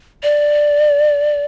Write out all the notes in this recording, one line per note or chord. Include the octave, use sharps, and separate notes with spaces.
D5